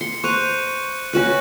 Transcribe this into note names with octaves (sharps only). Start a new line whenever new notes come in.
C6 C#7
C5 A#5 C#6 F#6 D#7
C#4 F#4 B4 F#6 F#7